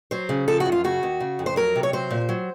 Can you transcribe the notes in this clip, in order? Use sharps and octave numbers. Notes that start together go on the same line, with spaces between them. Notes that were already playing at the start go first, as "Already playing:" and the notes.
F#3 C5
C#3
F3 A4
F#4
F#2
F4
C#3 F#4
D#2
C#3
F2
C5
F#3 A#4
C3
C#5
F#3 C5
A#2
F#3